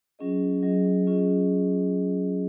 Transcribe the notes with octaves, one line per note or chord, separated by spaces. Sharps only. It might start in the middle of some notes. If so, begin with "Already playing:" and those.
F#3 C#4 F4 G#4 D#5
F#3 C#4 F4 G#4 D#5
F#3 C#4 F4 G#4 D#5